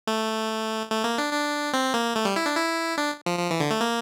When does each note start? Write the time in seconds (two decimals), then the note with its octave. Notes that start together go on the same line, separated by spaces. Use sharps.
0.07 A3
0.91 A3
1.04 A#3
1.18 D4
1.33 D4
1.73 C4
1.94 A#3
2.16 A3
2.25 G3
2.36 E4
2.46 D4
2.57 E4
2.98 D4
3.26 F3
3.39 F3
3.51 E3
3.60 D3
3.71 A3
3.81 A#3